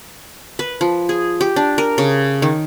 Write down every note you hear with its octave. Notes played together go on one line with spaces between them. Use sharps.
B4
F3
G#4
G4
D4
A#4
C#3
D#3